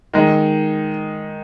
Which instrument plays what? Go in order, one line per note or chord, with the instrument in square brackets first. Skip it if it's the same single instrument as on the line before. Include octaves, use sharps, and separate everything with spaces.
[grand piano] D#3 G#3 D#4